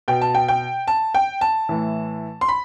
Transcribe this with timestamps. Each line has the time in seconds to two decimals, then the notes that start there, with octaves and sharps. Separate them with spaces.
0.08 B2 G5
0.21 A5
0.35 G5
0.48 G5
0.87 A5
1.15 G5
1.41 A5
1.69 A2 E3
2.41 C6
2.48 B5